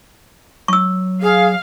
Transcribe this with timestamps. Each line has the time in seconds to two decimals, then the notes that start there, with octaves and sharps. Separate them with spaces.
0.68 F#3 C#6 E6
1.22 G#4 F5